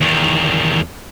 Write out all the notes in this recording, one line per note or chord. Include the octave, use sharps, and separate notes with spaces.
E2 D#3